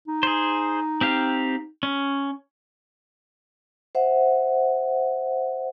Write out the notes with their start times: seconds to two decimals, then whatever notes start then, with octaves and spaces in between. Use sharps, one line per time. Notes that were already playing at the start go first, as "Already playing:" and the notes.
0.08 D#4
0.23 G#4 C5
1.01 C4 G4 F5
1.83 C#4
3.95 C5 E5 F#5